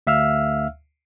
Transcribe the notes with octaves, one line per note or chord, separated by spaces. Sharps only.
D2 E5 F5 E6 F6